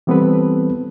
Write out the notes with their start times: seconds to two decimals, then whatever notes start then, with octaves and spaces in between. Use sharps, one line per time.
0.07 E3 G3 B3 C4 A4 B4